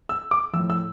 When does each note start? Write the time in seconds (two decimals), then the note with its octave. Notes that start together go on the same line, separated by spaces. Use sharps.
0.09 E6
0.31 D6
0.53 F3 E6
0.56 A2
0.70 E6